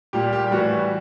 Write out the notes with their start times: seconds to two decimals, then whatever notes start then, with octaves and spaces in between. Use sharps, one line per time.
0.13 A#2 G3 G4
0.33 G4
0.47 G4
0.52 A2 E3 G3 F#4